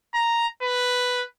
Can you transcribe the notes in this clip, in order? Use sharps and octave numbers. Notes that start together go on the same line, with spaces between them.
A#5
B4